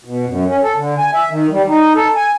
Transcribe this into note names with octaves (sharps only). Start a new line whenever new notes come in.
B2
F#2
C#4
A4
D3
G#5
E5
D#3
G3
D#4
A4
G#5